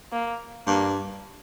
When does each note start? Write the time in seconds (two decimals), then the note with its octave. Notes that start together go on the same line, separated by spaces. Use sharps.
0.12 A#3
0.67 G2 A#3